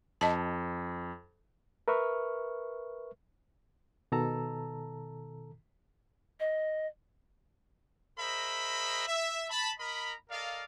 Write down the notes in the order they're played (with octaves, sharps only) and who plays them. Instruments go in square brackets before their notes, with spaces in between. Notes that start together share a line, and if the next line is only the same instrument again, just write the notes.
[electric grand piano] F2 [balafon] D#5 A5
[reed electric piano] A#4 B4 E5 C#6 F6
B2 D#3 A4 A5 A#5 E6
[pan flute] D#5
[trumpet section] G#4 A#4 C5 D#5 E5 B5
E5
A5 B5
A#4 D#5 A#5 B5
A4 A#4 D5 D#5 F5